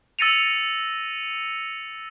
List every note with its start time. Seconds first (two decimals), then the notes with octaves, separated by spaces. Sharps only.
0.19 E6 A6 A#6 C#7 D#7 F7